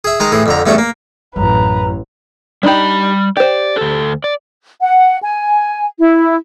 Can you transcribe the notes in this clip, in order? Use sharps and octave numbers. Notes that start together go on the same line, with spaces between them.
G#4 E5
D#3 G#3 D#5 A#5
A2 E3 G#4
F2 D3 A#5
E2 G2 A3 C#4 E5
A#3
A1 F#2 B4 A#5
G3 D4 D#4 G4 B5
G4 C5 D5
D2 A4
D5
F#5
G#5
E4